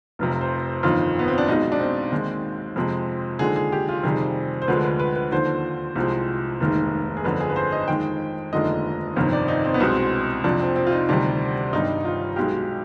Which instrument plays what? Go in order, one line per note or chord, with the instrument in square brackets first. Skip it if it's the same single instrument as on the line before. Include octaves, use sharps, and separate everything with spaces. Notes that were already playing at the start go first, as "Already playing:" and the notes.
[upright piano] F1 F2 C3 F3
C5
G1 F2 D#3 F4
B3
C4
D4
B1 B2 G#3 D#4
D4
C4
D#2 D#3 G#3
F2 C3 F3 G#3
D#2 D3 F3 G#3 G#4
G#4
G4
F4
F2 C3 D#3 G3 G#4
C5
D2 D3 F3 G#3 B4
B4
B4
B4
D#2 D3 F3 C5
C2 C3 F3 G#3
F1 D#2 D#3 G#3
G#4
G1 F2 D3 B4
G#4
B4
C5
D#5
F2 D#3 G#3 G5
F1 D#2 D3 F3 G#3 D#5
G1 F2 C3 D#3
D5
D#4
C4
B3
C2 B2 G#3 C4
F2 C3 F3 D4
C4
C4
F4
D#4
D2 C3 D#3 G3 D4
G1 G2 D#3 G3 D#4
F4
B1 B2 G#3 G4